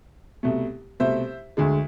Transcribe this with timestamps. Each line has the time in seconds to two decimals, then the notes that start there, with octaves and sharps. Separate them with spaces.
0.43 C2 B2 A3
1.00 C2 B2 A3 C5 E5
1.57 D2 D3 G#3